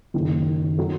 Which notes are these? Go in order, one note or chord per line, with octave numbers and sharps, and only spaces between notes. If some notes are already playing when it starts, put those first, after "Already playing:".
F#1 F#2 D#3
D#3 F#3 A3